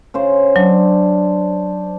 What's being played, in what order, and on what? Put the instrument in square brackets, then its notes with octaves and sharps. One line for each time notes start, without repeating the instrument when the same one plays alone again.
[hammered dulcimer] C#3 C#4 C5
[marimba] F#3 [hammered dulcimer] D4